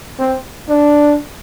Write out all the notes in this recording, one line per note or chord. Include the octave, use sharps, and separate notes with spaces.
C4
D4